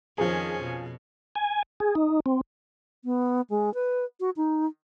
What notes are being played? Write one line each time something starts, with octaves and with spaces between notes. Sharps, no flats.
F2 D#3 F3 C#4 G#4
B2
G#5
G#4
D#4
C4
B3
G#3
B4
F#4
D#4